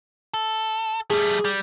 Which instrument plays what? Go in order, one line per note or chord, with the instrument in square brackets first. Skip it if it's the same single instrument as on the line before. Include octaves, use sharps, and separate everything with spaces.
[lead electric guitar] A4
[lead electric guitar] G3 A3 [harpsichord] G#4
[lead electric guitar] G3